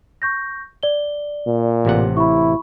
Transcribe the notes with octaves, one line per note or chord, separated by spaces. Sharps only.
C#6 G6 A#6
D5 G7
A#2
A1 C3 F#5
E4 B5 C#6